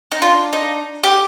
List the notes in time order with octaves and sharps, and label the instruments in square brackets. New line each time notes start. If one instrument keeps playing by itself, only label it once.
[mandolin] D#4
[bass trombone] D4 [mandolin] F4
[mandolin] D#4
G4